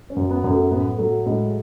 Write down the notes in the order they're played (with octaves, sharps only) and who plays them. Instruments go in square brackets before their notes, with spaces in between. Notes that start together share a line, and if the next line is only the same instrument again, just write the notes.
[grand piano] C#4
F#2
B3
F#2
A3
A2 B3
F#3 A3
A2 G#3